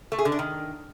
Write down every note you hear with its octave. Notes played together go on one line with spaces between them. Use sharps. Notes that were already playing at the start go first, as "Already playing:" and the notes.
A3
G#4
D3
D4
D#3